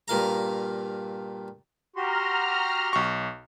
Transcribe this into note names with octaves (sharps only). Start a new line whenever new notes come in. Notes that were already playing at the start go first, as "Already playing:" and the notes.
G2 A#2 F5 A#5
F#4 G4 A#5 C6 F6
B1 C#6